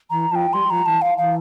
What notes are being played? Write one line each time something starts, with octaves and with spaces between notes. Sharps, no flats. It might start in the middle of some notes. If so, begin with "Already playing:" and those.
E3 A#5
F3 G5 A5
G3 C6
F3 A#5
E3 A5
F5
E3 F5